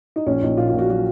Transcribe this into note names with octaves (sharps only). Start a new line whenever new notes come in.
D#4
A#1 C#4
A#1 D#4
A#2 F4
F4
A#1
F#4
F#3 F#4